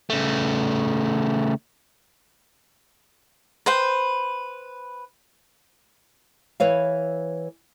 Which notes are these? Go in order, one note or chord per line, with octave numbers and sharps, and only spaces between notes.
C#3 A3
B4 C5 G5
E3 B4 C#5 F5